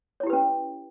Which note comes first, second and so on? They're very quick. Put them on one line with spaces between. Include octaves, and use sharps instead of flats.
C#5 E4 G4 B4 C#4